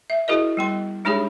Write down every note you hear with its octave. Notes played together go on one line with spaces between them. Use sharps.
E5
E4 F#4 G#4 A#4 D#5
G3 B3 C6
G#3 D4 D#4 G4 G#4 C#5